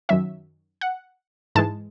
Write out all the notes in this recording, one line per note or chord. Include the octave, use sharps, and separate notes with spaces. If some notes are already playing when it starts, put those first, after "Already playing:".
F#2 D#3 F#3 C#4 E5
F#5
G#2 E3 G#3 A5